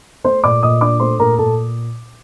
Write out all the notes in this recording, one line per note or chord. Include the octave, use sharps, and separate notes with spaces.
A3 C5 C6
A#2 D5 D6
A#2 D#5 D#6
D4 D5 D6
A3 C5 C6
A#2 A#4 A#5
A#2 A4 A5